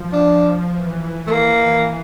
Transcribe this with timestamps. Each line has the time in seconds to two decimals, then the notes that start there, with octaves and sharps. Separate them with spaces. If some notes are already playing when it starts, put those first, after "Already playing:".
Already playing: F3
0.13 D4
0.72 E3
1.27 A3
1.31 E3 A#3